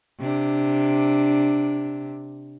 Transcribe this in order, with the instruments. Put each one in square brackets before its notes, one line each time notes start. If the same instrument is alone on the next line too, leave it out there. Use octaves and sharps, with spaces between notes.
[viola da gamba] C3 D4